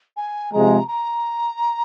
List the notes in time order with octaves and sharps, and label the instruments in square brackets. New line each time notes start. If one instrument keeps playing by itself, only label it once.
[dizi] G#5
[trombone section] C3 F3 G#3 [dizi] A#5
[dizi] A#5